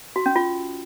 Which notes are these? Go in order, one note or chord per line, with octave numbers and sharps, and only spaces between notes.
F#4
C#4
F4